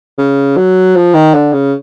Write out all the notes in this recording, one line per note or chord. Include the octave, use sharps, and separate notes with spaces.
C#3
F#3
F3
D#3
D3
C#3